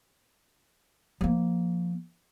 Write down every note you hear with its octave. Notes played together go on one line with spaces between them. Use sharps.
F3 A#3